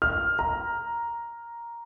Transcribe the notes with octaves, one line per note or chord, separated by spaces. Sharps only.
F6
A#5